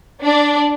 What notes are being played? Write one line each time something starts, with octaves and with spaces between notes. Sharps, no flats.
D4